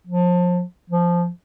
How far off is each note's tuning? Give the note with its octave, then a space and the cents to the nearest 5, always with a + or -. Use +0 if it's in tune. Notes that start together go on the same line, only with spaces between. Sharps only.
F3 +30
F3 -5